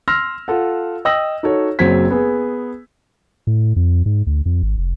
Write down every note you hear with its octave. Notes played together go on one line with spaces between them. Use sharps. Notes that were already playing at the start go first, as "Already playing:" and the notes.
C6 E6 F6 A#6
F4 A4 F#5
D#5 G5 D#6 E6 A#6 F#7
D#4 F#4 A4 C#5
F#1 F#3 C4 C5 G#6 B6
B3 G#4
A2
F2
G#2
D2
F2
G#1
F1